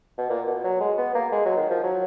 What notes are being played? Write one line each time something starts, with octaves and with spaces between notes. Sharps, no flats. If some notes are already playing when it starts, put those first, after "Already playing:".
B2
A#2
B2
F#3
G#3
B3
A#3
G#3
F#3
D#3
F3
F#3